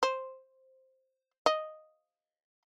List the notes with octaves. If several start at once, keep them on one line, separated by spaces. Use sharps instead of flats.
C5
D#5